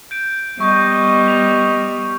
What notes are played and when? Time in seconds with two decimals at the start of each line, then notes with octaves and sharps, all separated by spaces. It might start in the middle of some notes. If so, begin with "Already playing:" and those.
0.11 G6 D7
0.60 G3 B3 D#5 C#6 G6
1.26 B6 F7